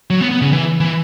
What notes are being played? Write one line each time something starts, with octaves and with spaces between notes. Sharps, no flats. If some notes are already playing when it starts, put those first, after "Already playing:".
F#3
B3
B3
C#3
E3
E3